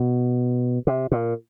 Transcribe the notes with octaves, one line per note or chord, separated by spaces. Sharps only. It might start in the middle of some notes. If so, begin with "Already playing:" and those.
Already playing: B2
C3
A#2